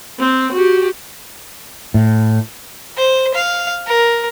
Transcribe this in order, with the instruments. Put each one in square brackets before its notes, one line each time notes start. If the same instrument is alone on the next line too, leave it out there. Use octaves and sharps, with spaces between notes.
[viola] C4
F#4 G4
[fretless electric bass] A2
[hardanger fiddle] C5
F5
A#4